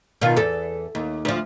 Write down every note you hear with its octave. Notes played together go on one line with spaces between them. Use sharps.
B2 D#3 F4
E2 A4
D#2
D2 F3